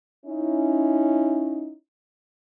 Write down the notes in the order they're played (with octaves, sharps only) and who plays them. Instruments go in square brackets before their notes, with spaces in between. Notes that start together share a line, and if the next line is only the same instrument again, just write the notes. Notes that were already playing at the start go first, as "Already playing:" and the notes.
[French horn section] C#4 D#4 E4